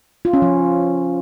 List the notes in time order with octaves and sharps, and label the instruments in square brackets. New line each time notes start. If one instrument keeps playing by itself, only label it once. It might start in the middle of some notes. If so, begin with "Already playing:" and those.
[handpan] F4
C#4
F3